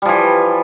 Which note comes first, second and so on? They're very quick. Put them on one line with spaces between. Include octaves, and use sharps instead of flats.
G3 F3 E3